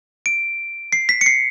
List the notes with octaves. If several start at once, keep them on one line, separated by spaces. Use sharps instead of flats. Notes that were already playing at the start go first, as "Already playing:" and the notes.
D7
C7
B6
C#7
C7